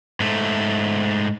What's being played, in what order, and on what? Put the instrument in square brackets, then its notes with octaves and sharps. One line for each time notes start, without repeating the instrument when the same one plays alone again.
[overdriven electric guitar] G#2 A3